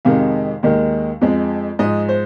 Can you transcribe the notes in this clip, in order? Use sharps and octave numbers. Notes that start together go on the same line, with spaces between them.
F2 C3 D#3 G#3 F5
D#2 D#3 G#3
F2 F3 G#3
G#2 F3 G#3 D#5
C5